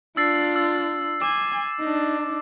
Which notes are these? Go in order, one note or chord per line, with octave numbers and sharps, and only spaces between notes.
D4 F4 E6 A6 C7
E6
G#5 D6
D4 D#4